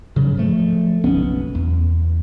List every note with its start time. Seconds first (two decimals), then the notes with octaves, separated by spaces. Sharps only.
0.16 G#2 C#3 F#3
0.37 F3 A3
1.04 F#1 B1 B3 C#4
1.55 E2